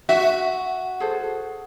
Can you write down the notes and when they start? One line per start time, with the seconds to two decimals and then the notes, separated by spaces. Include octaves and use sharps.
0.09 F#4 E5
1.00 G#4 A4 C5